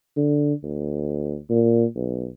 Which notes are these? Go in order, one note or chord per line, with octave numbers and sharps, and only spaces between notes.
D3
D2
A#2
B1